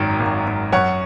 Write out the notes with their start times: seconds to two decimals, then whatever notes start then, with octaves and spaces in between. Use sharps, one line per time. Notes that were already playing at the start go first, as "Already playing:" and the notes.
Already playing: G#1 F#2 D#3 F#3 A#4
0.20 G#1
0.47 G#1
0.72 F#2 C#5 F#5